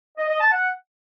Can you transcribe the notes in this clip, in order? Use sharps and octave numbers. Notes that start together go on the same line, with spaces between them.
D#5
D#5
A5
F#5